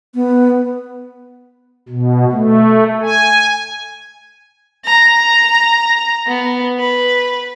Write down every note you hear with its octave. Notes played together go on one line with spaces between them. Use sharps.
B3
B2
A3
G#5
A#5
B3
B4